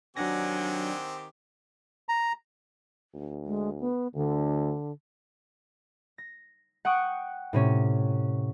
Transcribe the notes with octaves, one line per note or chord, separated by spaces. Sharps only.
D#3 F#3 C4 D4 G4 F#5 G#5 A#6
A#5
D2
G#3
B3
D2 D3
A#6
F#5 G5 C#6 D#6 F#6
A2 C3 C#4